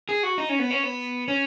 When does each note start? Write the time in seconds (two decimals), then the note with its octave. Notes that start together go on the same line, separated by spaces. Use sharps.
0.09 G#4
0.23 F#4
0.38 D#4
0.49 C#4
0.59 B3
0.71 C#4
0.83 B3
1.28 C#4